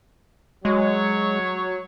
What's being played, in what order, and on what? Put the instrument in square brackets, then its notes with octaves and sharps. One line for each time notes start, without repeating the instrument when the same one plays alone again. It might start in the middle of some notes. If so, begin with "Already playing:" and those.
[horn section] F#3 C#5 [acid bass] G#3